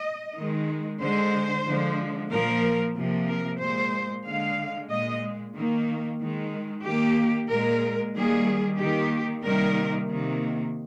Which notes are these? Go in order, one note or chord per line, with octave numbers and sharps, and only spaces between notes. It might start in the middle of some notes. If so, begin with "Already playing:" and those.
Already playing: D#5
D#3 G#3
D3 G#3 C5
D3 F3 G#3
A#2 F3 A#3 A#4
C3 F3 A#3
A#4
A#2 G#3 C5
D3 G#3 F5
A#2 G#3 D#5
D#3 A#3
D#3 G#3
D#3 A#3 G4
A#2 G#3 A#4
D#3 G3 A#3 G#4
D#3 A#3 G4
C3 D#3 G3 A#3 A#4
C3 D#3 A#3